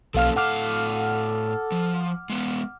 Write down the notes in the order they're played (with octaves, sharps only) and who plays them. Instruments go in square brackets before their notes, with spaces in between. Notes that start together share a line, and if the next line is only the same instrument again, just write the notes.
[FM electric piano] B1 F5 F6 [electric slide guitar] F3 A#3 C#4 [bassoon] A4
[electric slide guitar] A2 F5 [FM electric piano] F#5 D6 F6
[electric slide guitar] F3
G#3 B3